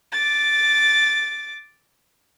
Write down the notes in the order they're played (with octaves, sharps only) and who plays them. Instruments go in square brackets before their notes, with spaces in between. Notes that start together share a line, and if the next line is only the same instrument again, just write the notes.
[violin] D6 A6